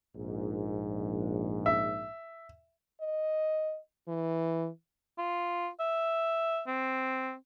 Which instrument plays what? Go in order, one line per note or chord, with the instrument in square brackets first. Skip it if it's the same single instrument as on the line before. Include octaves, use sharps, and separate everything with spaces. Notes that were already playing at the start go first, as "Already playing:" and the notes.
[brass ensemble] A#1 G#2
[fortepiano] E5
[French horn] D#5
E3
[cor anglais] F4
E5
C4